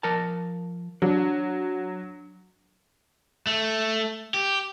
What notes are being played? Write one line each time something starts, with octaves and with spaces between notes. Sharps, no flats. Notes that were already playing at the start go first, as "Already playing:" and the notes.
F3 A#4 A5
F#3 D4
A3
G4